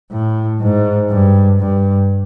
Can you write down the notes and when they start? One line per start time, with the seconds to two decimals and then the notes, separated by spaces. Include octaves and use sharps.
0.11 A2
0.61 G#2
1.10 G2
1.59 G2